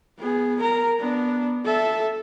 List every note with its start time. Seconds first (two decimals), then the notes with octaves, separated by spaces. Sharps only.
0.19 B3 G#4
0.60 A#4 A#5
0.99 B3 D4
1.65 A4 E5